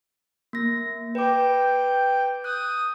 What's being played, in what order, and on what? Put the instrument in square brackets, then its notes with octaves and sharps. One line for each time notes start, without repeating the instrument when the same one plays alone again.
[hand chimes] A#3 A#6
[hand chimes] B4 D6 [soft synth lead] G5
[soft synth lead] D#6 [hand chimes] F#6 G6